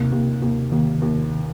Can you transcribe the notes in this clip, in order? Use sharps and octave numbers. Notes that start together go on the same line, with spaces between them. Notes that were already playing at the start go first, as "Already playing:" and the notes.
Already playing: D#2 C3
D#2
D#2
D#2 D#3
D#2